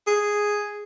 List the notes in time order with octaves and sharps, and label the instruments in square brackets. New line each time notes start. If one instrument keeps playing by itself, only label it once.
[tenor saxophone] G#4